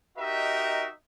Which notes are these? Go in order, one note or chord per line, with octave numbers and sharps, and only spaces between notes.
D#4 F#4 G4 A#4 D#5 E5